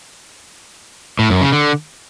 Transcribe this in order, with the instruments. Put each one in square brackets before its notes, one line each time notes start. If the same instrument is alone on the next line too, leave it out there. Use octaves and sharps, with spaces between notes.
[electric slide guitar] A2
F#2
C#3
D3